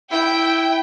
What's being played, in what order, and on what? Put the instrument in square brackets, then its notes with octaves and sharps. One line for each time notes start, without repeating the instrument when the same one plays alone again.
[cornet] E4 [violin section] G5